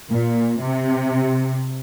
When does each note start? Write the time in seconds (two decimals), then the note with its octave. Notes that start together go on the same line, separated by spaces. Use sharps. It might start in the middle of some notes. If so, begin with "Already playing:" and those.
0.12 A#2
0.60 C3